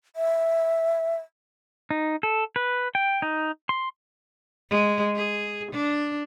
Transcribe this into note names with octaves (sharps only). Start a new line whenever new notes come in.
E5
D#4
A4
B4
G5
D#4
C6
G#3
G#4
D4